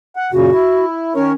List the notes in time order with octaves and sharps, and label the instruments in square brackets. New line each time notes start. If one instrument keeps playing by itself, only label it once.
[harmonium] F#5
[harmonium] F#2 A#2 C#3 [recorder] F#4
[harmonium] E4
[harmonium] D#3 A#4 C#5 [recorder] C#4